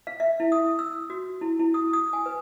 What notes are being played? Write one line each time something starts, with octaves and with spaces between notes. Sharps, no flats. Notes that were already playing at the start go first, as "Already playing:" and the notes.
F5
E5
E4
D#6
E6
F#4
E4
E4
D#6
D#6
G#5
B4